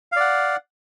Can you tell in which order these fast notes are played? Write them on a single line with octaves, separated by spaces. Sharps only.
F5 D5 F#5